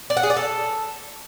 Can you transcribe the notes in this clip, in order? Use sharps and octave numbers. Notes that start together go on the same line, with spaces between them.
D5
F#5
G#4
D5
A4